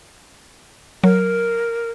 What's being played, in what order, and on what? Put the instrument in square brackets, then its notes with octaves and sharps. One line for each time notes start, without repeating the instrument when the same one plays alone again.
[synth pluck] F#3 [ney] A#4